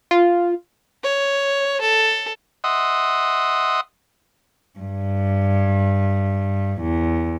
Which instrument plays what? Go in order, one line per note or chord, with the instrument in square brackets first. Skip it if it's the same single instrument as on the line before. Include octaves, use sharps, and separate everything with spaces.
[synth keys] F4
[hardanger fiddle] C#5
A4
[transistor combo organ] D#5 E5 F#5 C6 D#6
[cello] G2
E2